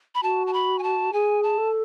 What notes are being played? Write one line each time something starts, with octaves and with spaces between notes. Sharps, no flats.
B5
F#4 A5
A5
B5
G#5
A5
G#4 G#5
A5
A4